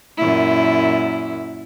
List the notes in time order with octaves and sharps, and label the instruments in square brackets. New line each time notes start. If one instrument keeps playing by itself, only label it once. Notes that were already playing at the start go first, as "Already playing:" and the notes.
[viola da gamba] F#2 A#2 E4